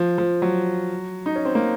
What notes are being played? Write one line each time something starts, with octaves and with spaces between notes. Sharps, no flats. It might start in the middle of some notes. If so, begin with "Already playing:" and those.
Already playing: F3
F3
F#3
D#4
C#4
C4
A#3